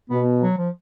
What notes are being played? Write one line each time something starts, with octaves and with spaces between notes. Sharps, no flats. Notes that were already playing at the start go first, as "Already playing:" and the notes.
B2 B3
F#3
F3